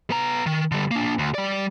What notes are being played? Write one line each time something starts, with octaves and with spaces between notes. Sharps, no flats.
B3 A#5
D#3
D3 G3
A#3 D4
D2
G3 D5